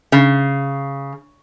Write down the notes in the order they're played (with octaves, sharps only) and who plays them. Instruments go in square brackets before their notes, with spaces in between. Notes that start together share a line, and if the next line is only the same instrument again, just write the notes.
[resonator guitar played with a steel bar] C#3